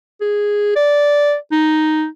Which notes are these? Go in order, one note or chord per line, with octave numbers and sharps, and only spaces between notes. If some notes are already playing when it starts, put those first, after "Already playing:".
G#4
D5
D#4